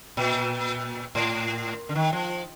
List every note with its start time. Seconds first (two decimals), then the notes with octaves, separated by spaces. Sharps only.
0.17 A#2
1.15 A2
1.89 D3
1.95 D#3
2.13 F3